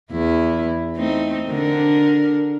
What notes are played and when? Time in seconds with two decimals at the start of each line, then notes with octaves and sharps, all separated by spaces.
0.11 E2 E4
0.96 A3 C4 D#4
1.49 D3 D4 A#4